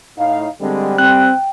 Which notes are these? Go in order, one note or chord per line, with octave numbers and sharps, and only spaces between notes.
A2 D#4 F5
D3 G3 G#3 C4
C4 G5 F#6